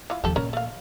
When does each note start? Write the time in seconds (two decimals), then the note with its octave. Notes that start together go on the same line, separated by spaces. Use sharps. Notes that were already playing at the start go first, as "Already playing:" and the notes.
0.10 E3 F4
0.24 D#2 F3 G4 A4
0.36 A#2 C#4 A#4
0.53 A3 F5